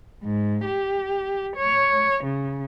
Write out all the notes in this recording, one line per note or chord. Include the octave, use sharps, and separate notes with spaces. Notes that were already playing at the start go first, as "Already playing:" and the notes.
G#2
G4
C#5
C#3